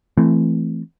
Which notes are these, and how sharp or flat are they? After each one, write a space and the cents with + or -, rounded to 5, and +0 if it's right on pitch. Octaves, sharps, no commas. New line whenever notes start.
E3 +20 A3 +0 C4 +0